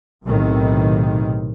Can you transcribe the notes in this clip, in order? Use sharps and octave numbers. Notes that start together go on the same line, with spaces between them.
B1 A2 C3 D#3